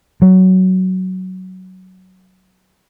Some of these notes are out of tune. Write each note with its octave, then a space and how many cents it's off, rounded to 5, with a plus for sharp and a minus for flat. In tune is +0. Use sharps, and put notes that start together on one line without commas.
F#3 +10